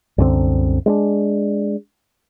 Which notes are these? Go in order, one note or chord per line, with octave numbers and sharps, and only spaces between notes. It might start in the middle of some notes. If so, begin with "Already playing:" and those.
C2 F#2 D3 C4
G#3 C#4 D4